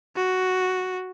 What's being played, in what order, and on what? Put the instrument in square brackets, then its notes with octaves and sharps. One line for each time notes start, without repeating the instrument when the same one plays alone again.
[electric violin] F#4